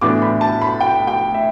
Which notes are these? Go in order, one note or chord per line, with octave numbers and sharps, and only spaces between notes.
A2 E3 B3 D4 D6
B5
A5
B5
G5
G5
E5